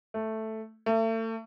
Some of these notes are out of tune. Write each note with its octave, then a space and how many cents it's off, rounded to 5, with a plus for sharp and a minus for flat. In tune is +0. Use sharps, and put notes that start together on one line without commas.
A3 +0
A3 +35